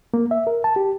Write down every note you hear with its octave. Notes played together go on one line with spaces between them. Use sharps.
A#3
E5
A#4
A5
G4